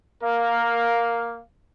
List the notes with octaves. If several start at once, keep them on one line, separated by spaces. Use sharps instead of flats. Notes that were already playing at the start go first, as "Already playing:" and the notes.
A#3 A#4 F5